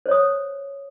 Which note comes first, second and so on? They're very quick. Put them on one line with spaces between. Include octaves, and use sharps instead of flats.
C5 C#5 D#6